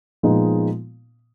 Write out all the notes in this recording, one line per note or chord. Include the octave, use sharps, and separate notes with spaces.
A#2 F3 G#3 B3 D#4